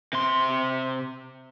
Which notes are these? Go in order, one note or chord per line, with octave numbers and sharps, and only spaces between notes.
C3 C6